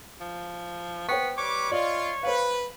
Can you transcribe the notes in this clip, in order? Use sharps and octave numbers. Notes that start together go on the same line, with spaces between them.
F3
B3 C5 G5 C#6
G3 B4 C#5 D6
F4 D5 D#5
B4 C5 F5